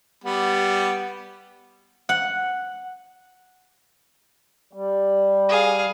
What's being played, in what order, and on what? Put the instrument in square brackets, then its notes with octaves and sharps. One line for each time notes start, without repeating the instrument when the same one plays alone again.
[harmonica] G3 B3
[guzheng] F#5
[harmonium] G3
[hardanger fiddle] G#4 F5